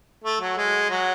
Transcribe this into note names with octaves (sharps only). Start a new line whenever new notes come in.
A3
F#3
G#3
F#3